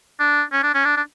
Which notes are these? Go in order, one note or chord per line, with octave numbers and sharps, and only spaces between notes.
D4
C#4
D4
C#4
D4
D4